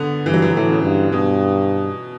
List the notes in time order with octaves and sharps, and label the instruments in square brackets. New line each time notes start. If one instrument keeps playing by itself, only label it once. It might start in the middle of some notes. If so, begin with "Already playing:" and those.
Already playing: [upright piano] D3 B3
[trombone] G2 [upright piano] E3
[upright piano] F#3
E3
F#3
[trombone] A2 [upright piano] E3
[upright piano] C#3
[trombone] G2
[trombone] G2 [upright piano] B2